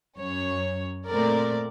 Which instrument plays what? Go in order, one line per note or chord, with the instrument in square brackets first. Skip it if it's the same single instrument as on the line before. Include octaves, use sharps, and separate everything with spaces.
[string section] F#2 C#5
A#2 A3 C4 A#4 D5